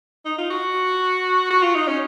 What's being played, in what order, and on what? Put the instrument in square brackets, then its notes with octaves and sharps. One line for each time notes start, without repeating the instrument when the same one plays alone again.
[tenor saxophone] D#4
F4
F#4
F#4
F4
D#4
C#4